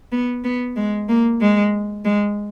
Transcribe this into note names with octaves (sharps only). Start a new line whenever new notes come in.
B3
B3
G#3
A#3
G#3
G#3